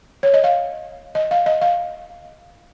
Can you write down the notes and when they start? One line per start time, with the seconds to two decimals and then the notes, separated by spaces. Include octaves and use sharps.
0.23 C#5
0.34 D#5
0.44 F5
1.15 D#5
1.31 F5
1.46 D#5
1.62 F5